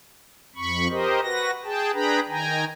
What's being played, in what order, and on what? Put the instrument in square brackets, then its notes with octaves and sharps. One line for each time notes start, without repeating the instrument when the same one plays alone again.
[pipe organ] F2 B5 C#6
G4 A#4 C5 D#5
F#4 B4 A#6
G#4 G5 A5
D4 G#4 B4 G5 A#5 B5
D#3 G5 G#5 A#5